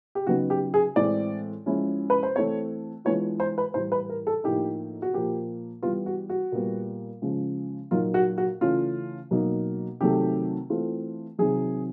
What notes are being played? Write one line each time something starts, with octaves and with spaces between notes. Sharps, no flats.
G4
C#3 F#3 B3 D#4 F#4
G4
G#4
A2 E3 G#3 C4 D5
F3 G#3 C#4 E4
B4
C5
E3 A3 C4 C#5
E3 G#3 B3 D4 F4 C#5
C5
B4
A2 E3 G3 C5
B4
A#4
A4
A2 F3 A#3 D#4 G4
F#4
A#2 F3 A#3 G4
E3 G3 B3 F4
F#4
F#4
A#2 G3 B3
C#3 F3 G#3
A#2 F#3 A#3 D#4 F4
F#4
F#4
C#3 E3 A3 C#4 F4
B2 F#3 A#3 D#4
C3 D#3 F#3 A3 G4
E3 A3 C4 F4
C3 D#3 F#3 G#4